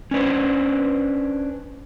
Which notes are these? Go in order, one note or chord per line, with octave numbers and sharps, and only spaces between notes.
C#4 D4 B4 C5